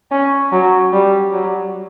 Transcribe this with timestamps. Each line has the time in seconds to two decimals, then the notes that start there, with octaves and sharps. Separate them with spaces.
0.11 C#4
0.52 F#3
0.93 G3
1.33 F#3